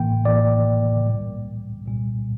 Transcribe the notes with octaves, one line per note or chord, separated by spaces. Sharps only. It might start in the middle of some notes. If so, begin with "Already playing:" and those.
Already playing: A1 A2 E3 A#3 G5
A1 A2 E3 A#3 D5
C2 A#2 G3
C2 A#2 G3